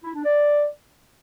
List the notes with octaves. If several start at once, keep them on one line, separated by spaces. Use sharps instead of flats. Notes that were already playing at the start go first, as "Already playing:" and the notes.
E4
D4
D5